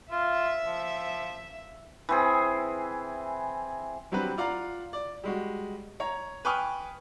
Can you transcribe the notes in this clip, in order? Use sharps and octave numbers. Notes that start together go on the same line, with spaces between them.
F4 E5
F3
E3 C4 G#4
F#3 G3 C4 D4 B4
F4 D5 F5 F#5 A#5
D5
G3 G#3 F#4
C#5 A#5
B4 G5 G#5 C#6 D#6 F6